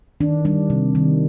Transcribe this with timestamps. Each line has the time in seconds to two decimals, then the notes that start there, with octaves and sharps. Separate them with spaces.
0.20 D#3 D4
0.45 G3 D4
0.70 C3
0.95 D#3